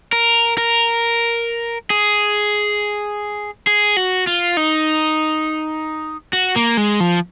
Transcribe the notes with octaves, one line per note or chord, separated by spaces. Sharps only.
A#4
A#4
G#4
G#4
F#4
F4
D#4
F#4
A#3
G#3
F3